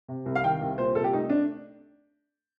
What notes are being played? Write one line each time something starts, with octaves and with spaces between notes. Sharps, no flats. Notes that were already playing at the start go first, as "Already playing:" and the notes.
C3
C2
F5
D#3 G5
C2
A#2 C5
C2 A4
G4
A3 D#4
D4